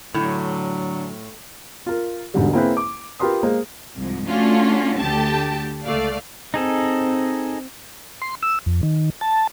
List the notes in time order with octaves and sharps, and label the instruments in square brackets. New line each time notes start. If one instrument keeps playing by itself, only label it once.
[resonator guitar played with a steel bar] A2 [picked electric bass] D3 [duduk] F#3
[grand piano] F4 A#4
E1 G#2 D3 G3
A#3 C4 E4 G#4 B4
D6
F4 G4 A#4 B4 C6 D#6
G#3 A#3 C5
[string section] C2 G#2 F3
A3 C#4 D4 F4 F#4
D2 D3 G4 A5 A6
C#2 A3 D5 F5
[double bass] C4 [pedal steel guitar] D#4 G#4 A4
[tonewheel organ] C6
E6
F2
D#3
A5